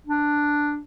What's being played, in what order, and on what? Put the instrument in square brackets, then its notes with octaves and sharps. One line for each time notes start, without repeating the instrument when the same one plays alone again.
[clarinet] D4